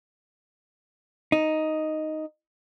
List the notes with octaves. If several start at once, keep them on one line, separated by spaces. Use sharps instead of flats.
D#4